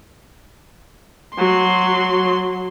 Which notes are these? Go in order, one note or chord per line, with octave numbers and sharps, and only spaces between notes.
F#3 C6